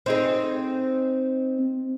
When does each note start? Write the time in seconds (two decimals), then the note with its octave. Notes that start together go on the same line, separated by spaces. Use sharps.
0.06 C4 D#4 G#4